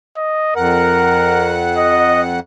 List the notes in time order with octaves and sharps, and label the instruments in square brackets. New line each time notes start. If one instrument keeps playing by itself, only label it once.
[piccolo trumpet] D#5
[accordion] F2 F#5 [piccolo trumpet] A#4
[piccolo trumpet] D#5